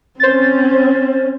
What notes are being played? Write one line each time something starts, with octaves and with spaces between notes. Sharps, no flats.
C4 C#4 C5 A6